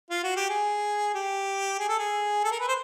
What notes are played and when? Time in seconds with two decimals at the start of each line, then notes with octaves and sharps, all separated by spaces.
0.10 F4
0.23 F#4
0.36 G4
0.50 G#4
1.15 G4
1.79 G#4
1.89 A4
1.99 G#4
2.44 A4
2.52 A#4
2.60 B4
2.68 C5